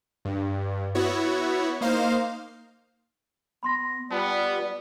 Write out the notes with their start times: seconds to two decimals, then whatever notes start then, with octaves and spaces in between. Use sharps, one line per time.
0.25 G2
0.95 B3 E4 F#4 C#5
1.81 A#3 D#4 C5 F5
3.63 B3 B5 C6 A#6
4.11 G3 B3 F4 A5